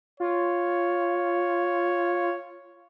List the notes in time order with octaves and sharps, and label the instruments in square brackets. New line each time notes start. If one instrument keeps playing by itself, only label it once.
[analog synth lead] F4 [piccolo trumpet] C#5